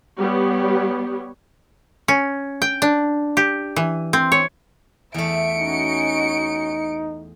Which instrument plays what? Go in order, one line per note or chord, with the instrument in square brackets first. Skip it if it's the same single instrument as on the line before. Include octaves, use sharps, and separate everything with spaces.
[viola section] G3 B3 G4 C#5
[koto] C#4
G5
D4
G4
E3
C4
C#5
[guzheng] E2 A3 [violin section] E5 [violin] C#7 D7
[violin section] C#4 F#4 D#5 [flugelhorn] D#4